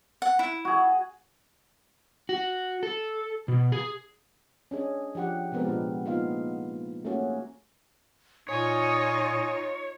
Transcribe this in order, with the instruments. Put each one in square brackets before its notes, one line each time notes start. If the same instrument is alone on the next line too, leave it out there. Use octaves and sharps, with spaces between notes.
[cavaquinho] F#5
E4
[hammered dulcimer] F#4 G#4
[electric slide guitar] F#4
A4
B2
G#4
[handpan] C#4 D4 G#4 D#5
F3 D4 G4 F#5
C3 F3 G#3 B3 C4 A#4
A#2 D4 G4
A#3 B3 D#4 F4 F5
A3 A#3 C#4 F#4 G#4
[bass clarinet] A#2 [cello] D#4 F4 [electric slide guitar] C#5 [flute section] G#5 C#6 D#6